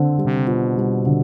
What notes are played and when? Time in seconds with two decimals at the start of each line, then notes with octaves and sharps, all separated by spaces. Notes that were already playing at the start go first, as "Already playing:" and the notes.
Already playing: D3 C4
0.18 G3
0.25 C3
0.47 B2 F4
0.77 G3
1.06 D3